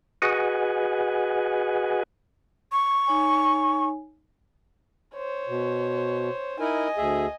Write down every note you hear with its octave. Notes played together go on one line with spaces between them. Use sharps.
F#4 G#4 B4 D#5 F#5 G#5
C#6
D#4 C#5 G#5
C5 C#5
B2
D#4 E4 A#4 D#5 G#5
D2 G#4 E5